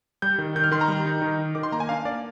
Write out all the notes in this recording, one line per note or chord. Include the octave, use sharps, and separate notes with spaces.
G3 G6
D#3
D#3 G6
F6
D#3 C6
A#5
G3
D#4
D#3
D#4
D#3 D6
C6
A#3 A#5
G#5
D4 F5
A#3 D5